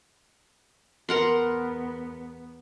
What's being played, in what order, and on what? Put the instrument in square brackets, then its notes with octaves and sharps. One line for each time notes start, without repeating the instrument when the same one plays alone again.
[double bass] E2 B3 [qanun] A#4 F#5 C6